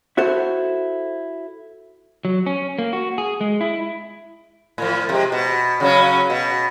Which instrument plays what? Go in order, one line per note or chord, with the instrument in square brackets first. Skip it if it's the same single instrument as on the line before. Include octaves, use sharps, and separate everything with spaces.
[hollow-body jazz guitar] E4 F#4 A4 C5
[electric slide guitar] F#3
C#4
A#3
F#4
G#4
G#3
E4
[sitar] A2 F3
C3 G#3
B2
C#3 F#3 C#4
B2